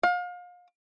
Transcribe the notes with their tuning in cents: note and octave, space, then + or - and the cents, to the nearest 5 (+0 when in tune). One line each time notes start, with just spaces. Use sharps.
F5 +35